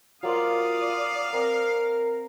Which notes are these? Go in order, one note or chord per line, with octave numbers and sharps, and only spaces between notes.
F#3 A#3 F4 C5 D5 F5 D#6
C4 A#4